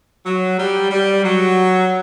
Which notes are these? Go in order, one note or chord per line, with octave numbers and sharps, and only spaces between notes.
F#3
G3
G3
F#3